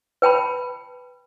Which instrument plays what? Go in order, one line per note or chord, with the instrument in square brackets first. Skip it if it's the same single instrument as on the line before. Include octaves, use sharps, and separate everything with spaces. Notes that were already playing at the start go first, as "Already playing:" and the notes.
[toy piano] B4 G5 A5 B5